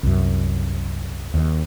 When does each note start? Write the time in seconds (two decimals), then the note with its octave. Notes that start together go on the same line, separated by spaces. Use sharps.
0.03 C2 F#2
1.34 D#2